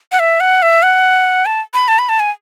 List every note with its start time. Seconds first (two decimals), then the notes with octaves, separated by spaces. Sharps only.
0.12 F#5
0.19 E5
0.40 F#5
0.62 E5
0.83 F#5
1.46 A5
1.74 B5
1.88 A5
1.99 B5
2.09 A5
2.20 G#5